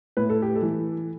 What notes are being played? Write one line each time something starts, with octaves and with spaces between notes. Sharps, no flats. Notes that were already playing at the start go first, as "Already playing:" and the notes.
A2 B4
A4
G4
A4
E3